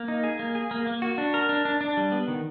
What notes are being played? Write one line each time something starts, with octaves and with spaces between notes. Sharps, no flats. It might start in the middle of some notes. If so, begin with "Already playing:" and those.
Already playing: A#3
D#4
G#4
A#3
G#4
A#3
A#3
F#4
D4
A#4
D4
D4
D4
G3
B3
D#3